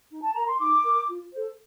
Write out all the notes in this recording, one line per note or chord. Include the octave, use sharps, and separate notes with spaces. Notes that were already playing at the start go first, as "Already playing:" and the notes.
D#4
A5
A#4 A#5
C6
D#4 D6
A#4
F4
A4 C5